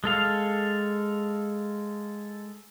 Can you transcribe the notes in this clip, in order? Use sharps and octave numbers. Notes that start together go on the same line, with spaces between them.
G#3 A4 F5